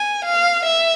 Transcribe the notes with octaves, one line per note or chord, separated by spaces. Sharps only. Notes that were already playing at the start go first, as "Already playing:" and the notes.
Already playing: G#5
F5
E5